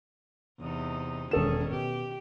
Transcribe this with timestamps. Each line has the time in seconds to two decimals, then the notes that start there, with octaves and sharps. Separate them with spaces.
0.60 E2 C3 D#4
1.31 E1 D#3 C#4 G#4 A4 E7
1.70 B2 G4